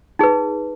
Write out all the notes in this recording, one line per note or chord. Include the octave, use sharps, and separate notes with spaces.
D#4 G#4 B4